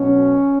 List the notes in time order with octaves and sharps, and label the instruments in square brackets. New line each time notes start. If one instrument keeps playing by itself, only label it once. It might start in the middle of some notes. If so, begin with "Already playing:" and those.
Already playing: [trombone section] B2 F#3 C#4